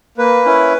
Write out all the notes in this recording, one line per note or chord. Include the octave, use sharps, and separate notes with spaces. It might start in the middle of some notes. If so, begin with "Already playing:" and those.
A#3 B4
C#4 E4